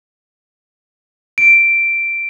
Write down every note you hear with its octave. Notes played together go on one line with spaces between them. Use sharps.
D7